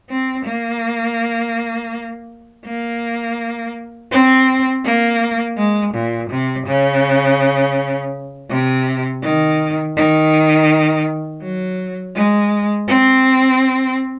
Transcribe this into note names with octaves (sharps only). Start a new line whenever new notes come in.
C4
A#3
A#3
C4
A#3
G#3
A#2
C3
C#3
C3
D#3
D#3
F#3
G#3
C4